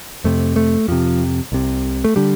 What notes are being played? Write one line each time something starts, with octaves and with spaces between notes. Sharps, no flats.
F2 C3 A3
A3
F2 C3 F3
C2 C3
A3
D3 G3